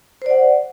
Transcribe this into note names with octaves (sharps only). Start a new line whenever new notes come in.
C5 D5 F#5